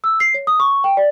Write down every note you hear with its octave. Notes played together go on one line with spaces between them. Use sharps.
E6
C7
C#5
D#6
C#6
G5
D5